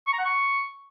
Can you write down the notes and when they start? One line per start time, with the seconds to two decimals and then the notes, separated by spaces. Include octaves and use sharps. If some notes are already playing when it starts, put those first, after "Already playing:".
0.07 C#6
0.13 A#5
0.19 F#5
0.24 C#6